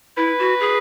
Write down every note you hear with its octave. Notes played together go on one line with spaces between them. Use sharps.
E4 B4
F#4
G#4